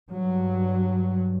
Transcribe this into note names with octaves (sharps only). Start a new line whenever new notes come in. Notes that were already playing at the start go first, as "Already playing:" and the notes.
G2 F#3